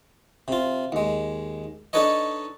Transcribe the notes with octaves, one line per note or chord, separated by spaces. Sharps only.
C3 F4
D#2 G#3
D4 D#4 A4 B4 C#5 D#5